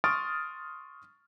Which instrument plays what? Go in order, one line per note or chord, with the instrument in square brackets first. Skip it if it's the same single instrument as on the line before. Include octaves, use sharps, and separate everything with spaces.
[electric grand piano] C6 C#6 D#6 F6 A6 D7